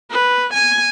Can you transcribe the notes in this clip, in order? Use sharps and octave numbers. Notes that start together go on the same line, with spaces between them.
B4
G#5